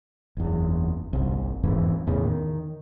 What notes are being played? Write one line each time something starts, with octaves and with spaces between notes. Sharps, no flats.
F#1 E2
G1 C2
E1 F2 G#2 E3
E2 A2 C#3
D#3